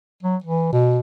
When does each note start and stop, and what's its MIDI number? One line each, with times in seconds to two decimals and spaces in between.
0.23 0.36 54
0.44 0.72 52
0.73 1.00 47